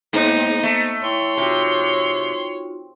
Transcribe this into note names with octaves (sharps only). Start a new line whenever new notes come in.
G#2 A#3 B3 D#4 C5
A3
E4 C#5 G5 C6
C3 D#4 F4 F#4